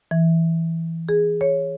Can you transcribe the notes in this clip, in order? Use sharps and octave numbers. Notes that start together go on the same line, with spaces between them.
E3
G#4
C#5